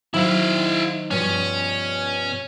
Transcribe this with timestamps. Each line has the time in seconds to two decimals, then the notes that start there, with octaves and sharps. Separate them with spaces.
0.14 D#3 F#3 E4 C5 F5
1.11 G2 B2 F3 C#4